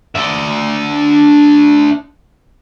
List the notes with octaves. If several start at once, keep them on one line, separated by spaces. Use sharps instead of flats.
D4 E5